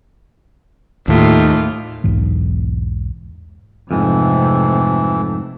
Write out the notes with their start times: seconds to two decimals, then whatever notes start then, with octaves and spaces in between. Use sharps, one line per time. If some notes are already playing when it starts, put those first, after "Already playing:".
1.08 D#2 A2 F4
2.04 B1 E2 G#2 E3
3.91 F2 G#2 C3 E3 A3